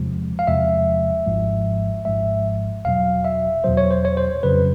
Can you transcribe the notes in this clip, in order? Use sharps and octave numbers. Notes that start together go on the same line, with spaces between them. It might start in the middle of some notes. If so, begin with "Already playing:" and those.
Already playing: E2 C3 F3 G#3
F5
E2 C3 F3 G#3 E5
G#1 G#2 F3 G#3
G#1 G#2 F3 G#3 E5
E2 B2 F#3 F5
E5
E2 B2 F#3 C5
C#5
C5
C#5
C5
F2 C#3 F#3 B4